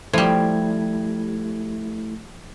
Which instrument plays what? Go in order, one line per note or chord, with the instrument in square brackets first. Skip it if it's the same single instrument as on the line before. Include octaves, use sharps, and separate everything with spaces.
[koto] F3 G3 [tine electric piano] A3 E4 G#6